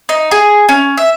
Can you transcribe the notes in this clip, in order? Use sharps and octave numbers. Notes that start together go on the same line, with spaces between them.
D#4
G#4
C#4
E5